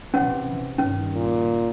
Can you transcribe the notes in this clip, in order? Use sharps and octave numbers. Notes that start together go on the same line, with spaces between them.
C3 E3 C#4 F#5
G2 D#3 C#4
A#2